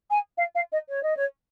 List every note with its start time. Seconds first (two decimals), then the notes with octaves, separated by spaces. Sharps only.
0.10 G#5
0.37 F5
0.55 F5
0.72 D#5
0.89 C#5
1.03 D#5
1.16 C#5